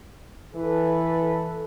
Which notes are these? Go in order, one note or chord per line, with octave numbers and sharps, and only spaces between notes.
E3 A4 B4